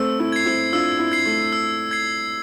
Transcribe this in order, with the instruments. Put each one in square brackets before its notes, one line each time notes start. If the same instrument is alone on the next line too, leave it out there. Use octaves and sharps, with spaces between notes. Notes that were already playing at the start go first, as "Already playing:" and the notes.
Already playing: [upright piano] A3 C4 [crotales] E6
[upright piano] C4 E4
[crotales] G#6 C7
[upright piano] C4 E4
[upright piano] D4 F4 [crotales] E6
[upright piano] C4 E4
[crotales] G#6 C7
[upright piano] A3
[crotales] E6
G#6 C7